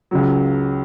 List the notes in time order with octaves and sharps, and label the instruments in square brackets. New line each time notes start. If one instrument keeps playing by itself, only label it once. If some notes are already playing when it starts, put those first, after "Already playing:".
[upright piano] C#2 C#3 F#3